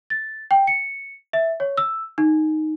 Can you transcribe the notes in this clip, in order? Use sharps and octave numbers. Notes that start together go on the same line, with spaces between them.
A6
G5
C#7
E5
C#5
E6
D#4